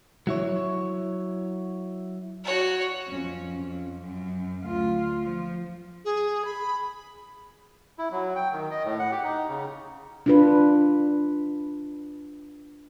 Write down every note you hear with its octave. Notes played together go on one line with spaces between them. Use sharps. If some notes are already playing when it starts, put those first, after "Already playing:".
F#3 E4 C#5
F#4 C#5
F2 C#4
F2
F#2
D2 F4
F3
G#4
B5
E4
F#3
G5
D#3
D#5
A2
F#5
G4
D#4
C#3
D4 F4 B4